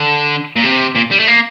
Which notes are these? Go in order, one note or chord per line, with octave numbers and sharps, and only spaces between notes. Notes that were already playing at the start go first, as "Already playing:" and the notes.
Already playing: D3
A#2
C3
A#2
G3
A3
A#3